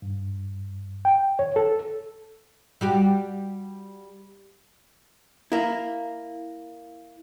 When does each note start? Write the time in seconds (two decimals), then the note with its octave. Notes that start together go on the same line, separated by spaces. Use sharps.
0.02 G2
1.05 G5
1.39 C#5
1.56 A4
2.81 G3 F#4 G4
5.52 A#3 E4